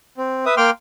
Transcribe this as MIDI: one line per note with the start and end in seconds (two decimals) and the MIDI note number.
0.17 0.45 60
0.46 0.55 71
0.46 0.55 76
0.46 0.55 87
0.57 0.70 58
0.57 0.70 79
0.57 0.70 84
0.57 0.70 86
0.57 0.70 89